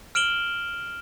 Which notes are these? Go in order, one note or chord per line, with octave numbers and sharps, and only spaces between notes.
F6 D7 E7 F#7 G7